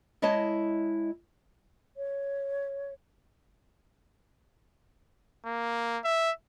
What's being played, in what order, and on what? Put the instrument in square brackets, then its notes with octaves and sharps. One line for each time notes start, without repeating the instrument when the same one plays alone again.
[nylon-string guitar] G#3 E4 C#5 D#5 A5
[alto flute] C#5
[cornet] A#3
E5